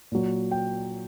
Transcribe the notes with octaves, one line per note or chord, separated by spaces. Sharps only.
A#2 F#3
G5